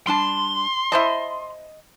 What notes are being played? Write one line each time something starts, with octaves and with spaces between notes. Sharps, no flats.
G3 D4 A5 C6
E4 C5 D#5 A5